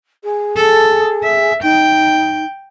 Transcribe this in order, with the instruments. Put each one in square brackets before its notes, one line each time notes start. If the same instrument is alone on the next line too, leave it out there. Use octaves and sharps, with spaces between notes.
[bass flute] G#4
[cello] A4
E5
[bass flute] D#4 [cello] G5